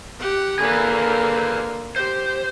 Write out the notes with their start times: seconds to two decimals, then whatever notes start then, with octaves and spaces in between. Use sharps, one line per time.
0.20 G4 F#5
0.59 D3 A#3 G#4 B4
1.96 G4 C5